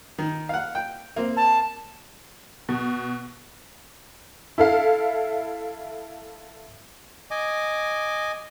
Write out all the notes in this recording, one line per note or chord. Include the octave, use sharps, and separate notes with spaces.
D#3
F5 F#5
G5
A#3 C4
A5
B2
E4 A4 F5
D#5 G#5 D6